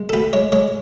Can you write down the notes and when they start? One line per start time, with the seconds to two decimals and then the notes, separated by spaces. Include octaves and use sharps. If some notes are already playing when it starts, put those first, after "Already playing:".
Already playing: G#3
0.09 A4
0.13 D2 B4
0.33 G#3 C#5
0.52 G#3 C#5